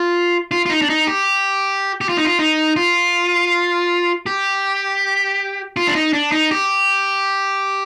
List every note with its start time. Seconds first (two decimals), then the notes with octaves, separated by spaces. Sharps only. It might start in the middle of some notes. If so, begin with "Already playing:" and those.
Already playing: F4
0.51 F4
0.66 F4
0.70 D#4
0.82 D4
0.89 D#4
1.07 G4
2.01 G4
2.09 F4
2.17 D#4
2.25 F4
2.39 D#4
2.76 F4
4.26 G4
5.77 F4
5.87 D4
5.95 D#4
6.13 D4
6.32 D#4
6.51 G4